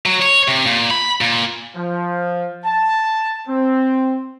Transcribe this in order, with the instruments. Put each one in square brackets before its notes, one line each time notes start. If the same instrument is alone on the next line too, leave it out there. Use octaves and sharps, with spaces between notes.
[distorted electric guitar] F#3
C#5
C3
A#2
B5
A#2
[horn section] F3
A5
C4